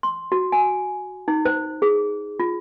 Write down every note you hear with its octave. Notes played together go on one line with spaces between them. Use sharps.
C6
F#4
G#5
D#4
C5
G#4
F4